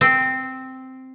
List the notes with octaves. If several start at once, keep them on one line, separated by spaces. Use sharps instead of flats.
C4